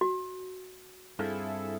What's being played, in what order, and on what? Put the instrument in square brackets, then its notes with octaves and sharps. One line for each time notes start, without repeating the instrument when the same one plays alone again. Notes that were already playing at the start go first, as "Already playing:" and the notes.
[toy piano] F#4
[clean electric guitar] G2 C4 F4 [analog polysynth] E4 G#4 A4